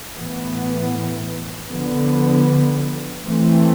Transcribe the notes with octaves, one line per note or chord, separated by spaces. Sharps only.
A2 E3 B3
D3 F3 B3
E3 A3 C4